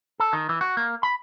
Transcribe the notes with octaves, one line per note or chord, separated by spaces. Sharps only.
A4
D#3
E3
F#4
A#3
B5